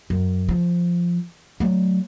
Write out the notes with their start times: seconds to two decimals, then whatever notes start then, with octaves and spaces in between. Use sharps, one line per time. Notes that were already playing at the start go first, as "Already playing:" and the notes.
0.10 F#2
0.49 F3
1.60 F#3 A3